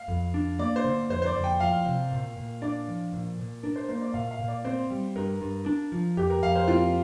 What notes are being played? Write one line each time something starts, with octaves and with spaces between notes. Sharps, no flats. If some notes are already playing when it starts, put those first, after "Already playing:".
Already playing: F5
F2
D4
A#3 D5
C5
D3
F2 C5
C5
D5
F2
G5
F3 F5
C3
A#2
A#2
D4 D5
F3
A#2
A#2
D4 A#4
C5
A#3 C5
D5
A#2 F5
F5
A#2
D5
C4 C5
G3
G2 A#4
G2
D4
F3
F2 G4
A#4
F2 F5
C5
C4 F4